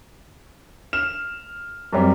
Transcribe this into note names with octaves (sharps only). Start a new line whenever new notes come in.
F6 E7
F#2 G3 C4